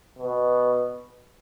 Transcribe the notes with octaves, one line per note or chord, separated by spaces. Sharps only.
B2